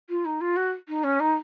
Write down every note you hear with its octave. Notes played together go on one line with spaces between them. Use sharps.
F4
D#4
F4
F#4
D#4
C#4
D#4